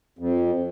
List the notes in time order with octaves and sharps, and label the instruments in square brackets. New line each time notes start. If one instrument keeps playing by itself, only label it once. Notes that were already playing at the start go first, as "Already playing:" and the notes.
[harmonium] F2